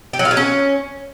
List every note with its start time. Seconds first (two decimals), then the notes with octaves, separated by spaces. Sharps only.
0.13 G4
0.19 F#3
0.25 F4
0.31 F#3
0.37 C#4